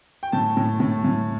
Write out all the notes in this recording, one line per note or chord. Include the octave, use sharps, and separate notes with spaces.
G5
A2 A5
A2
A2
A2